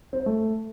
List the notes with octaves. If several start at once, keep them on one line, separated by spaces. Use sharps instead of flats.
C4
C5
A3